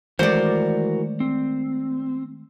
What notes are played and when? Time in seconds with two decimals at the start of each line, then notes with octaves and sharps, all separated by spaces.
0.19 D#3 E3 G#3 A3 F#4 A#4 C5 D5
1.20 C4